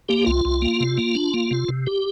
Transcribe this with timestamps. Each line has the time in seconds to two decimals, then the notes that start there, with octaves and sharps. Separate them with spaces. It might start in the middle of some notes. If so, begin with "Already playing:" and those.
0.09 A#3 G4
0.26 C2 F4
0.45 C2
0.62 A#3
0.80 C3
0.98 A#3
1.15 D4
1.34 A#3
1.51 C3
1.68 C3
1.87 G4